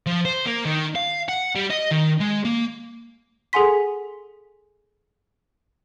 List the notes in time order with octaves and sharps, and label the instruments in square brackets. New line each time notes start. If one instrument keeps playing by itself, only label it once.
[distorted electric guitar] F3
C5
A#3
D#3
F5
F#5
G3
D#5
D#3
G#3
A#3
[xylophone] G#4 A4 F#5 G#5 C6 B6